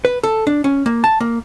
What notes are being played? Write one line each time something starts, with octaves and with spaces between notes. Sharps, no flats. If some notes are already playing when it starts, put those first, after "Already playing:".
B4
A4
D4
C#4
A#3
A5
A#3